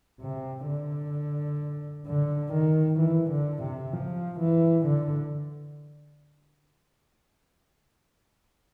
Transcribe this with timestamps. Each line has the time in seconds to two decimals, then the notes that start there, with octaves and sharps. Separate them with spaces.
0.21 C3
0.68 D3
2.07 D3
2.53 D#3
3.00 E3
3.31 D3
3.63 C3
3.93 F3
4.40 E3
4.86 D3